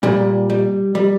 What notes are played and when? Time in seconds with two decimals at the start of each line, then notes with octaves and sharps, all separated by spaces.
0.03 A#2 G3
0.50 G3
0.95 G3